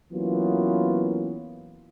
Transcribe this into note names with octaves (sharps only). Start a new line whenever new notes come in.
E3 F#3 A#3 B3 C#4 F4